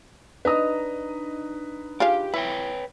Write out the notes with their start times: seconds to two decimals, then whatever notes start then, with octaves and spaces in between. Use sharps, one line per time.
0.45 D4 D#4 B4 D#5 A#5 D#6
2.00 F4 G4 G#4 F5
2.34 E4 B4 C#5 G5